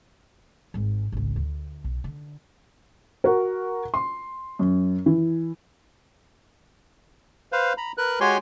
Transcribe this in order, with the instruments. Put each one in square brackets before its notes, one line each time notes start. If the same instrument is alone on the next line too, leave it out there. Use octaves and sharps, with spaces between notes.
[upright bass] G#1 G#2
G#1 C#2
D2
B1
D3
[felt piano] F#4 A#4
C6
F#2
E3
[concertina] B4 C5 F5
A#5 B5
A#4 B4 F#6
G#3 F#4 G4 C#5 G#5 C6